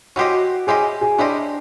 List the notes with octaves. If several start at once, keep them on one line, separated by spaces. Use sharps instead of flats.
C#4 E4 F#4 G4 C5 D#5
C#4 E4 G4 G#4 C5 D#5
G#4
C#4 D4 E4 G4 C5 D#5